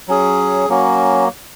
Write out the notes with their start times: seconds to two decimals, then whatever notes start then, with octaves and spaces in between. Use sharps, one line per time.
0.08 F#3 C#4 G#4
0.69 F#3 A#3 C#4 F#4